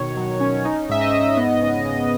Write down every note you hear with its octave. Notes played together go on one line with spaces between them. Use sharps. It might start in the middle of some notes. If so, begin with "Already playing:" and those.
Already playing: B2 D#3 C#5
F#3
C#4
D#4
G#2 E5
D#5
G#2
B3
C#3
C#3